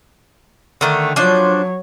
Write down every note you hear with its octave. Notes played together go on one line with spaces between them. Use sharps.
D3 D#3 A3
F3 F#3 D4 C5 C#5